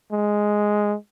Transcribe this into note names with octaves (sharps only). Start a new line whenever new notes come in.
G#3